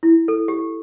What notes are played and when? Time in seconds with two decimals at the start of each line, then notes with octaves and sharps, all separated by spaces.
0.03 E4
0.28 A4
0.48 G4